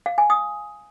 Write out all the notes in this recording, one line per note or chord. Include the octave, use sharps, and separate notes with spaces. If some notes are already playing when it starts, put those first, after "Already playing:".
F5
G#5
D#6